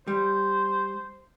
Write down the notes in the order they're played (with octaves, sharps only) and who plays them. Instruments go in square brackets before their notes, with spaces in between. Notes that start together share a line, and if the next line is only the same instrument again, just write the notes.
[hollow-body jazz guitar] G3 [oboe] C5